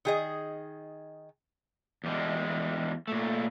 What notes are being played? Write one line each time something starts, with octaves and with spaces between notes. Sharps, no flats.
D#3 G#4 D#5
E2 G3 G#3
A#2 A3